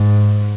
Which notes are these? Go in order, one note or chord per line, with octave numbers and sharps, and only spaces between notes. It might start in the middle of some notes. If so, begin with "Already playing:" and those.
Already playing: G#2